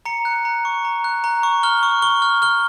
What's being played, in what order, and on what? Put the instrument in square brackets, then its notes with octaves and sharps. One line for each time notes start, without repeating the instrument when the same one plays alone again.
[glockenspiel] A#5 C#7
F#6
A#5
C#6
A#5
F#6
A#5
C#6
F6 G7
C#6
C#6 G7
F6
F6 G7